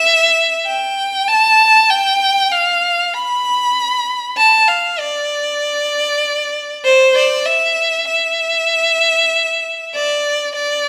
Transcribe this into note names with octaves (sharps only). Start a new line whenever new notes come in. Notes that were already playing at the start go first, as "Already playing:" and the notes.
Already playing: E5
G5
A5
G5
F5
B5
A5
F5
D5
C5
D5
E5
E5
D5
D5